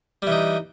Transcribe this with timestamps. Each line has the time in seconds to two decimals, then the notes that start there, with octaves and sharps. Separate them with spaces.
0.22 G3
0.27 E3
0.32 D#4